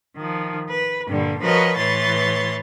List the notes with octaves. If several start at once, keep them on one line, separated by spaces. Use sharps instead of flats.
D#3 F3
B4
G2 A#2 D3 G3
F3 F#4 A#4 B4 C#5 D#5
A2 E3 B4 C#5 C6 A6